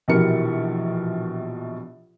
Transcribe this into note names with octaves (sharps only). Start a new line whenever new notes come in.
A#1 B2 E3 G4 A#4 C#7